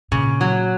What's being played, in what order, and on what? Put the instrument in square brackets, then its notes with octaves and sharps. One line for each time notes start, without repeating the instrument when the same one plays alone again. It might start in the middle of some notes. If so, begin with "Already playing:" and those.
[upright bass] A#2 [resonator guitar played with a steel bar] C#3
[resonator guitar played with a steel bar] F#3